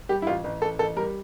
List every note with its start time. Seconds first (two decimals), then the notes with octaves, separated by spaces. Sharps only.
0.09 G3 G4
0.22 E4
0.27 A1 F4
0.44 A1
0.62 A1 A4
0.79 A1 A4
0.96 G3 A#4